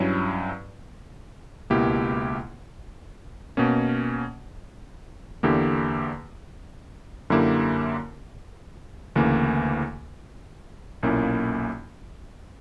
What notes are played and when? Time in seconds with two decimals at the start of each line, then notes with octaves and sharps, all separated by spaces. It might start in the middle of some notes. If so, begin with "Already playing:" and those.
Already playing: G2 F#3 C#4 E4
1.70 C#2 B2 A#3 E4 G4
3.57 B2 A#3 C#4
5.43 E2 D3 A#3 E4 G4
7.30 F#2 D3 A#3 E4 G4
9.16 D2 C#3 E3 A#3
11.03 B1 A#2 A#3 C#4 E4